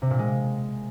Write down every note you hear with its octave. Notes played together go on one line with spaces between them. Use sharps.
C3
A#2
G#3